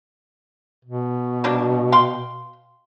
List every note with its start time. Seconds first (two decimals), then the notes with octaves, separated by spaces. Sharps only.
0.85 B2
1.44 G3 A#3 D4
1.92 F5 G5 C6